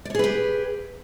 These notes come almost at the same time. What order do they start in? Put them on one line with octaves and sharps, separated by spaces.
D5 C#5 G#4 B4 G4